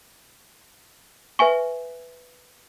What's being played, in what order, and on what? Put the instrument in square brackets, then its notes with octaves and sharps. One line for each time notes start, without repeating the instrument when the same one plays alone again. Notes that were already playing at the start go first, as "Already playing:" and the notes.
[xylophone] B4 E5 G#5 C#6